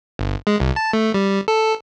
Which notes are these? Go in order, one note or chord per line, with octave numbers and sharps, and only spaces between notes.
G1
G#3
C2
A5
A3
G3
A4